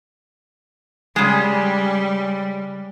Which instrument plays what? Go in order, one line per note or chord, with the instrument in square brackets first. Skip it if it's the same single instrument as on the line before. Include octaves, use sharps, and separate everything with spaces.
[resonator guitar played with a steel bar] C#3 G#3 [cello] G3